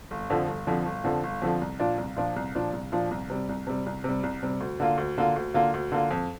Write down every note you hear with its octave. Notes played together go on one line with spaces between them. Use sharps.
G1
F2 D3 F3
G1
F2 D3 F3
G1
F2 D3 F3
G1
F2 D3 F3
C2
A#2 F3 D4
C2
A#2 F3 D4
C2
A#2 F3 D4
C2
A#2 F3 D4
C2
C3 G3
C2
C3 G3
C2
C3 G3
C2
C3 G3
D2
D3 A#3 F4
D2
D3 A#3 F4
D2
D3 A#3 F4
D2
D3 A#3 F4
F2